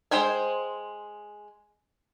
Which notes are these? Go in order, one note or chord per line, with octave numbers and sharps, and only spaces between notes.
G#3 C5 G5 G#5